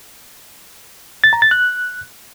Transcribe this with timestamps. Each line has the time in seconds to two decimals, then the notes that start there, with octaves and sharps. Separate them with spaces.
1.24 A6
1.33 A#5
1.42 A6
1.51 F#6